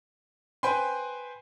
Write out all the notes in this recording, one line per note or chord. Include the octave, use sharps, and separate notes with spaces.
B4 C5 G5 G#5 B5 C6